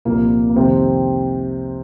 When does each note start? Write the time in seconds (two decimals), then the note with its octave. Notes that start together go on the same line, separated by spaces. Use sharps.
0.05 C2 A#2 F3 A#3
0.50 A#3
0.56 F2 C3 D#3 C4